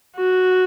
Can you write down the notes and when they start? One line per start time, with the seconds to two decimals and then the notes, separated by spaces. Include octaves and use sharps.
0.16 F#4